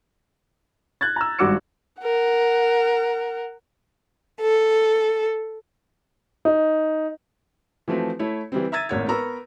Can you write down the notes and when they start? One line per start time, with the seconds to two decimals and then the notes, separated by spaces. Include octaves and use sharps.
1.01 F#6 G#6 A6
1.16 A#5 E6
1.39 G#1 G2 F#4 D6 E6 C#7
2.02 A#4 F#5
4.40 A4
6.45 D#4
7.88 E3 F3 A3 C4 F#4
8.19 A3 E4 C#5
8.52 E3 G3 C4
8.72 E5 A#5 E6 G#6 A6 D#7
8.89 G#1 A2 A#3 C#5 F#5 G#6
9.08 B3 A#4 A#5 B5 C#6 E6